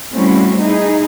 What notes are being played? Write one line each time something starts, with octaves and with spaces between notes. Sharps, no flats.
G3 A3 C4 C#4 E4 F#4
D#4 E4 G#4